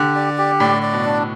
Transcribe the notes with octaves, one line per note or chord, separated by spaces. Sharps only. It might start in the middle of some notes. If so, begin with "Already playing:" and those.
Already playing: D3 G4
D5
G4
A2 D5
D5
B2
D4